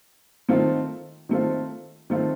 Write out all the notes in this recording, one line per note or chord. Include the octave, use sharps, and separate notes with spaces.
D#3 A3 C4 F4
D#3 A3 C4 F4
D#3 A3 C4 F4